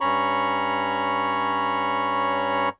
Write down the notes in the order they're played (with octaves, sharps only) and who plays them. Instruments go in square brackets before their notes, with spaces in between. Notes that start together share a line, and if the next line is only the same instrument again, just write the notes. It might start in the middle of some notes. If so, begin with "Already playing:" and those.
[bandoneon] G2 C#4 C#5 A#5 B5 C#6